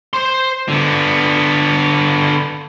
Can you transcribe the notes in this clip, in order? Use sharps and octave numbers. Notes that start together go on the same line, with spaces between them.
C5 C6
D3 B3